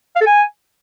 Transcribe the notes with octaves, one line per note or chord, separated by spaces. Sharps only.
F5
A4
G#5